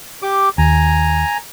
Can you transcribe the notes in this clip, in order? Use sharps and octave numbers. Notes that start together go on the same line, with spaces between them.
G4 D6
D#2 G#5 A#5